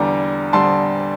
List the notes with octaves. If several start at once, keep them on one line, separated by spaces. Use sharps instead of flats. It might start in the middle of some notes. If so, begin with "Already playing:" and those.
Already playing: E2 D3 G3 A#5 D6
D3 G3 A5 C6